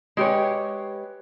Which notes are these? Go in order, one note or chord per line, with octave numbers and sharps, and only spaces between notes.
G#3 G4 B4 C#5